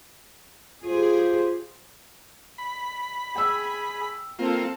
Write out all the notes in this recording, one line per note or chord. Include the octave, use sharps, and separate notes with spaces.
F4 G4 G#4 C5
B5
G#4 G5 E6
A#3 C4 F4 A4